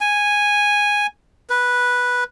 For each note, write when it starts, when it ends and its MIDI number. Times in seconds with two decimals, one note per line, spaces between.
0.01 1.07 80
1.50 2.24 71